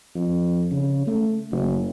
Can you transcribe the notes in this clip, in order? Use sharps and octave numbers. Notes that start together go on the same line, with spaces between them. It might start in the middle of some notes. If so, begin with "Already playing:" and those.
F2
C#3
A3
F#1